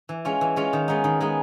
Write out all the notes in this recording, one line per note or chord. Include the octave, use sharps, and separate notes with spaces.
E3
G#3 C#4 F4
E3
G#3 C#4 F4
D#3
G#3 B3 D#4
D#3
G#3 B3 D#4